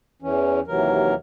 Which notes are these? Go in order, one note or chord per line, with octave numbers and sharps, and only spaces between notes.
E2 E3 C#4
D#2 C3 E3 F#3 A#4